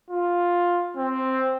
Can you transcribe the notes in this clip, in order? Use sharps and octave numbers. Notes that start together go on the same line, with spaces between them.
F4
C4